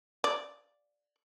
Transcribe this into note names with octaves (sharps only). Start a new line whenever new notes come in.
D5